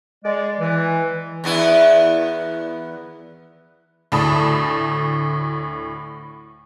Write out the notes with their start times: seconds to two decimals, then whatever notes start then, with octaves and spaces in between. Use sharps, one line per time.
0.25 G#3 D5
0.60 E3
1.44 E2 B3 E4
4.12 D2 A2 D5 A5 B5 D#6